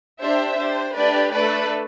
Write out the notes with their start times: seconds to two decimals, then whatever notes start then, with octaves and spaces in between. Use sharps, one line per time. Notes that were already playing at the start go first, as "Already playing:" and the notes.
0.20 D4 G4 C5 E5
0.57 D4 G4 C5
0.94 A3 D4 G4 B4 D5
1.32 A3 D4 A4 B4 D5